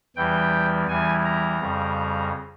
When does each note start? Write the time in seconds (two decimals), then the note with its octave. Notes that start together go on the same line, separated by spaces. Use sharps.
0.16 E2 E3 G3 G5
0.88 E2 E3 G3 G#5
1.24 A#5
1.60 F2 C#3 G3